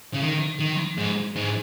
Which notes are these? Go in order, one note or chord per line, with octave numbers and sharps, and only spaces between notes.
C#3
D#3
D#3
G#2
G#2